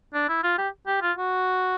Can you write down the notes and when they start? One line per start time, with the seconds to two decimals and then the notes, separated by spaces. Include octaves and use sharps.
0.14 D4
0.29 E4
0.43 F4
0.58 G4
0.87 G4
1.02 F4
1.17 F#4